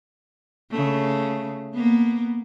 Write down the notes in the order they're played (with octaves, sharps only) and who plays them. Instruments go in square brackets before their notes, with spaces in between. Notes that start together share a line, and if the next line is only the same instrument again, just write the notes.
[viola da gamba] C#3 A3
A#3 B3